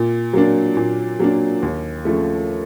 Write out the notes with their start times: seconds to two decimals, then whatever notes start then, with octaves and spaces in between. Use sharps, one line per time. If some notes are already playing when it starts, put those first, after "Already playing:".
Already playing: A#2
0.33 F#3 A#3 D4
0.77 A#2
1.20 F#3 A#3 D4
1.63 D#2
2.05 C#3 F3 A3